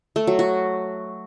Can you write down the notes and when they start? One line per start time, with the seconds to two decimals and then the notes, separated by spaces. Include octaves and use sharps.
0.16 A3
0.27 F#3
0.39 F#4